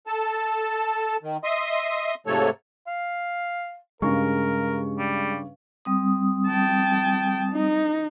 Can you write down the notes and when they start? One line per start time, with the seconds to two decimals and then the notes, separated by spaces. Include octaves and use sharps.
0.07 A4 A5
1.23 D#3
1.44 D#5 E5 C6 D#6
2.27 G#2 C3 F3 A3 A4 C#5
2.87 F5
4.02 G2 C#3 G#3 A#4 C#6
4.99 G3
5.85 G3 C4 D#6
6.47 G5 A5
7.53 D#4